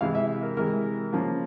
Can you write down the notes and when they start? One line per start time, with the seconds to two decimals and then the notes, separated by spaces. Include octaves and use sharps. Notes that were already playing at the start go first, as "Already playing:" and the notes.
0.01 C3 E3 G#3 F5
0.15 E5
0.43 A#4
0.57 C3 E3 G#3 A#4
1.13 C#3 F3 A#3